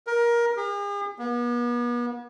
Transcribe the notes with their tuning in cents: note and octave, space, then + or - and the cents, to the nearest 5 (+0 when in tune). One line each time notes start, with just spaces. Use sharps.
A#4 +20
G#4 -45
B3 -40